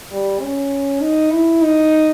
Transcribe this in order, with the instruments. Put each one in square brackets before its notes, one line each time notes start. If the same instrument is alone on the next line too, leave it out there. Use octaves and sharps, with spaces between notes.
[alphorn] G3
C#4
D#4
E4
D#4